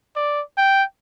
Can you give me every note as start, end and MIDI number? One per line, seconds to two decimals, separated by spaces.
0.16 0.41 74
0.58 0.83 79